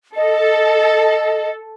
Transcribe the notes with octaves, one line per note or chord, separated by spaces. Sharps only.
A4 D#5